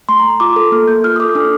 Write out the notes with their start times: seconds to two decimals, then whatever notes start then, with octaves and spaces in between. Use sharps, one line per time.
0.09 A3 C6
0.20 A#5
0.24 A3
0.30 C6
0.40 F4 D6
0.56 A4
0.72 A#3 F6
0.88 A#3 G6
1.04 F4 F6
1.16 D#6
1.20 A4 D6
1.35 D4